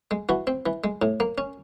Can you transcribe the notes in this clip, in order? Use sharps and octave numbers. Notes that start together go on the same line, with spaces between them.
G#3
E3 F#4
C4
E3
G#3
A2
A#3
C#4